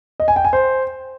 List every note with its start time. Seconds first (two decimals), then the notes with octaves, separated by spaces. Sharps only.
0.20 D#5
0.28 G#5
0.36 G5
0.45 G#5
0.53 C5